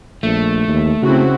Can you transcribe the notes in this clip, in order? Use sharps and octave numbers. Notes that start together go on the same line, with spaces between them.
A#1 A3
D#2
C#3 C4 E4 F#4